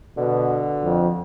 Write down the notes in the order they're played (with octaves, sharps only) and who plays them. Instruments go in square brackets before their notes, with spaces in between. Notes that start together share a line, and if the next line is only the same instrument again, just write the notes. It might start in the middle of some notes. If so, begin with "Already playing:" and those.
[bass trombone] B2 [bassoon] D3
[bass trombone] F2